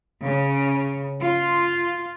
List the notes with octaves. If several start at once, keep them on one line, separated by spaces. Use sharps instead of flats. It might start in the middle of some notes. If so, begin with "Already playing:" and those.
C#3
F4